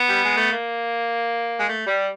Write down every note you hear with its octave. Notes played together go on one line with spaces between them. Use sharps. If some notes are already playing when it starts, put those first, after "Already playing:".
Already playing: B3
G3
G#3
A3
A#3
G#3
A3
G3